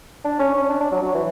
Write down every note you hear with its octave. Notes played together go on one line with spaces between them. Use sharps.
D4
C#4
C#4
D4
D4
F#3
F#3
E3